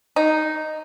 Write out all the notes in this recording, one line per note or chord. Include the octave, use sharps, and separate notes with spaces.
D#4